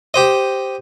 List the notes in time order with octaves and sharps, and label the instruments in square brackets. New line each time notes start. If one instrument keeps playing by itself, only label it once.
[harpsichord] G4 C5 D#5